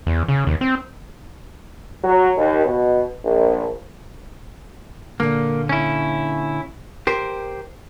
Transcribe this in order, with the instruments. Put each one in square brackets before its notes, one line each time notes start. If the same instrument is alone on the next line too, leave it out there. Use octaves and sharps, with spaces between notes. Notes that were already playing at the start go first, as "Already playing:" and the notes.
[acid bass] E2
C#3
D#2
C4
[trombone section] F#3
D#2
B2
A#1
[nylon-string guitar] A#2 D3 [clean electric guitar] A#3
[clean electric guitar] C#4 E4
[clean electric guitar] G4 C5 [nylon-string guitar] A#4